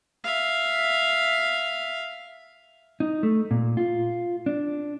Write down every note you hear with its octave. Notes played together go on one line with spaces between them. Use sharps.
E5 F5
D#4
A3
A#2
F4
D4